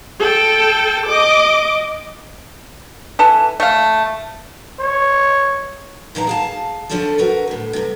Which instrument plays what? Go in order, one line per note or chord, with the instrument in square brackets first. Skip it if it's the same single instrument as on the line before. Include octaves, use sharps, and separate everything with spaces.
[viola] A4 G5
D#5 D6
[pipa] E3 A4 B4
A3 F5
[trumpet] C#5
[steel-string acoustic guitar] A#2 D#3 E3 D4 D#5 A#5
G#4 F5 A5
F2 D3 F3 C#4 D4 A4
F#4 A#4 B4
D2 A2
G2 C3